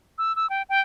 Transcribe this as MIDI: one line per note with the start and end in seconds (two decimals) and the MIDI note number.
0.18 0.35 88
0.36 0.49 88
0.50 0.62 79
0.69 0.81 79